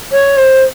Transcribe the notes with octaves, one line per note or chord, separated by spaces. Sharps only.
C#5
C5